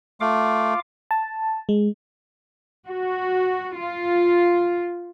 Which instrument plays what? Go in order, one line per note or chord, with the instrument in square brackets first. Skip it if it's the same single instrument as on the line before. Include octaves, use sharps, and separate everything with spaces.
[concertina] A3 [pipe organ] F4 F5 D6
[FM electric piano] A5
G#3
[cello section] F#4
F4